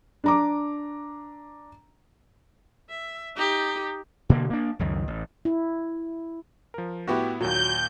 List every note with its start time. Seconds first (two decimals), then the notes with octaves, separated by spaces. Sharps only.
0.24 D4 A#5 D6
2.89 E5
3.36 D#4 G4
4.29 B2 D3 A#3
4.50 A#3 D4
4.79 C#2 F#2 D#3
5.08 A1
5.45 E4
6.74 F3 A#4
7.07 A2 B3 E4 F#4 G4
7.40 D#2 A#2 F#3 G6